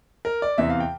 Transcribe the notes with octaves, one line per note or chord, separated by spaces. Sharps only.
A#4
D5
E2 C3 E3 E5
F5
G5